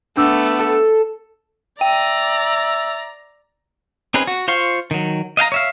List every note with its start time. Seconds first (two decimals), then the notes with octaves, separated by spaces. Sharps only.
0.17 A3 B3 D4 D6 E6
0.59 A4
1.81 D5 E5 G5 A#5
4.14 C4 C#4 D#4 G#4 B4
4.27 F#4
4.48 F4 C5 F5 C#6
4.91 D#3 F#3
5.37 D#5 F5 G5 A#5
5.52 C#5 E5 F5